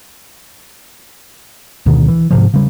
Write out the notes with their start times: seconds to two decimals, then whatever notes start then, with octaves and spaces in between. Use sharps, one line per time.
1.86 D2 B2 D#3
2.08 E3
2.31 G#2 C3 F3
2.54 C#3 G3